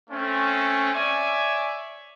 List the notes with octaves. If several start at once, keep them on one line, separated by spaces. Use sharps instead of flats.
A3 C4 C#4
C#5 D5 E5 G#5